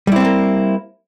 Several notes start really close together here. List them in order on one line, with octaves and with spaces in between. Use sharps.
G3 E4 C4 A3 A#3